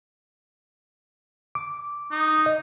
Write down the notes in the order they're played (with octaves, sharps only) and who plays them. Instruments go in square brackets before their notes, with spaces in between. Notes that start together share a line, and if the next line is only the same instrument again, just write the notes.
[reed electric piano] D6
[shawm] D#4
[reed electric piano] D#5